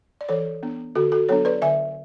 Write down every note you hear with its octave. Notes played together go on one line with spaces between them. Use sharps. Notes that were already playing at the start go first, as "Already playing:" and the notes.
D5
E3 A4 C#5
B3 D4
D3 F#4 A4
F#4 A4
F#3 B3 D4 A4 C#5
B4 D5
D3 E5 G#5